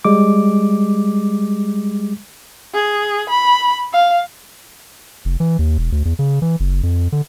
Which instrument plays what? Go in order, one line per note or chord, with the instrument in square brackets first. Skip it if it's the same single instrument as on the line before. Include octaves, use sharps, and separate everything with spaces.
[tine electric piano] G3 G#3 D6
[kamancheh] G#4
B5
F5
[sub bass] F1
E3
D#2
E1
D2
E2
C#3
E3
F#1
F2
D3